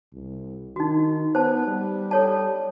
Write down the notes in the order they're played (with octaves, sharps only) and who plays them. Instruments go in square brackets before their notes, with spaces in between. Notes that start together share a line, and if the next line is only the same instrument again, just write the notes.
[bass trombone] C2
[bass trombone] D#3 [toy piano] D#4 F#4
[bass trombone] B3 [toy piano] C5 A5
[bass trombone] G3
[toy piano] A4 C#5 A5